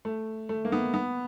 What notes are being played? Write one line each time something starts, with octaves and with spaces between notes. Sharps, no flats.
A3
A3
A#3
B3
B3